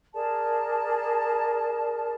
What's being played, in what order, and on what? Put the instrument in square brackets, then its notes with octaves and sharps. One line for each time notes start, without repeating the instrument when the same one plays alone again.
[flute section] G#4 A#4 D5 A5